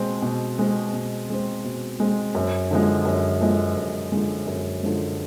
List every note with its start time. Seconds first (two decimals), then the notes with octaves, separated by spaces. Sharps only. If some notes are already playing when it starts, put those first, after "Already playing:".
Already playing: B2 G#3 C4
0.22 B2
0.59 G#3 C4
0.93 B2
1.30 G#3 C4
1.64 B2
2.00 G#3 C4
2.35 F#2
2.71 D3 F3 G#3
3.05 F#2
3.41 D3 F3 G#3
3.76 F#2
4.12 D3 F3 G#3
4.47 F#2
4.83 D3 F3 G#3